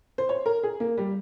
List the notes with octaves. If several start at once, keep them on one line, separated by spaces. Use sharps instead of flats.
C5
C#5
A#4
G#4
A#3
G3